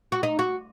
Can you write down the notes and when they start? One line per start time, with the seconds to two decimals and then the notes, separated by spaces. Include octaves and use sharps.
0.12 F#4
0.23 D#4
0.39 F#4